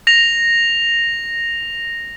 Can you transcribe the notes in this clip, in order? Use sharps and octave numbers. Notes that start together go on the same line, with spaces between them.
A#6 F7